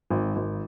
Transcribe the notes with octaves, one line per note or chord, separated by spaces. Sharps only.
G#1
G#1